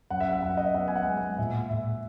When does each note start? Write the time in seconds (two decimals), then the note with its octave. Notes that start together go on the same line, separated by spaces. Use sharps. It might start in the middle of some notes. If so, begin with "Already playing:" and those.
0.10 F#2 F#5
0.20 E5
0.31 F#5
0.42 F#2 F#5
0.50 E5
0.57 D#5
0.65 E5
0.74 B3 F#5
0.88 G#5
0.96 F#5
1.06 G#3
1.17 G#5
1.38 A#2 E5
1.69 A#2 E5